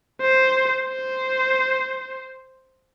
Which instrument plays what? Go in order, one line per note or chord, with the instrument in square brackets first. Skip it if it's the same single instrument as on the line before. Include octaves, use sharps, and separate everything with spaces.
[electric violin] C5
C5